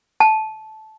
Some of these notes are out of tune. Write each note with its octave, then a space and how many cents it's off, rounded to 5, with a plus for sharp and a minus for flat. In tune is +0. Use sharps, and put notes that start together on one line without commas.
A5 -15